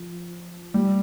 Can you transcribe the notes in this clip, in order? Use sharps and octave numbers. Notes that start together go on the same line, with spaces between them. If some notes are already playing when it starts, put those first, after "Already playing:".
Already playing: F3
G3